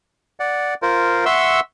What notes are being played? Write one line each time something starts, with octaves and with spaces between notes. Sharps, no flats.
D5 F#5
F4 A#4 C5
E5 F#5 C6 C#6 E6